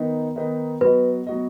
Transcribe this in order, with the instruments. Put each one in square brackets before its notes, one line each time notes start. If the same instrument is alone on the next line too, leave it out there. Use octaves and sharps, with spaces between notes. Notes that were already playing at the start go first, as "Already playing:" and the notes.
Already playing: [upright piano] D#3 B3 D#4 B4 D#5
D#3 B3 D#4 B4 D#5
[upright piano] F#3 B3 F#4 D#5 [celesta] B4
[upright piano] F#3 B3 F#4 D#5